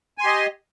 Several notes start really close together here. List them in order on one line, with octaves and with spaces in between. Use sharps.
G#5 C6 G4 D#5